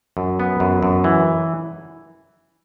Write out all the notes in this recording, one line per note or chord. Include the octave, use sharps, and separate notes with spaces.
F#2
B3
F#2
F#2
E3